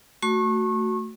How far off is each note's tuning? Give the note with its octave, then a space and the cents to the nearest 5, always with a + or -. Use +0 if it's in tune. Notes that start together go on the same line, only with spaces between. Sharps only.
A3 +15 F#4 +0 C#6 -30